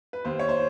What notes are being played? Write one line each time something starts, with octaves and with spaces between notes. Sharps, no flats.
B4
D#2 C5
C#5
C5